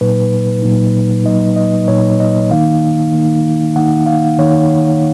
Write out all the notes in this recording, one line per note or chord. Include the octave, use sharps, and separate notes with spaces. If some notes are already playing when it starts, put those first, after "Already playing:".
A#2 F#3 A#3 D#4 B4
A#2 F#3 A#3 D#4
A#2 F#3 A#3 D#4 D#5
D#5
A#2 F#3 A#3 D#4 C#5
D#5
D#3 A#3 D#4 F5
D#3 A#3 D#4
D#3 A#3 D#4 F#5
F5
D#3 A#3 D#4 C#5